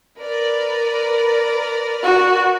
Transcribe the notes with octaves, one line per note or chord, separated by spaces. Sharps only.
A#4 B4 D5
F#4